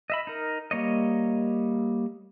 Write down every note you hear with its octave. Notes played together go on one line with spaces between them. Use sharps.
D#5 E5 B5
D#4 A#4
G3 A#3 C#5 D#5